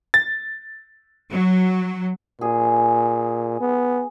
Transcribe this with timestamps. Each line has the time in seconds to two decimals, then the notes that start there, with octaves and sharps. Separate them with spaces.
0.14 A6
1.31 F#3
2.41 A#2 G#4
3.60 B3